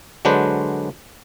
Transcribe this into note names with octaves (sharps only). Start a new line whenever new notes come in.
D3 F#3 G#3 D4 B4 C5